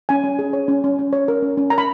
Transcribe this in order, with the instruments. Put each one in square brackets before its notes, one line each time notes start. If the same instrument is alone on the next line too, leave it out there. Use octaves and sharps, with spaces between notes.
[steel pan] C#4 G#5
C#4
G#4
C#5
C#4
C#4
C#4
C#5
A#4
C#4
C#4
A#4 A#5
B5